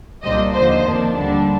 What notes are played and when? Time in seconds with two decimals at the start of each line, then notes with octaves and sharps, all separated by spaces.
0.23 C2 A#2 G3 A#3 D4 C5 D#5
0.54 D#2 D3 F3 C5 D#5
0.85 F2 D#3 A#3 D4
1.15 D#2 D3 G3 D4